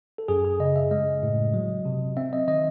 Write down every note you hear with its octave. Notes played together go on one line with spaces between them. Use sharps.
A4
F#2 G#4
G#4
C#3 D#5
E5
G#3 D#5
A2
F#3
C3
C4 E5
D#5
D#3 D#5